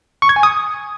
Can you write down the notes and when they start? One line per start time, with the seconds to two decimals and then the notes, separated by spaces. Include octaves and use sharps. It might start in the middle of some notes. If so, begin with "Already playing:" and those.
0.22 C#6
0.29 G#6
0.36 G#5
0.43 D#6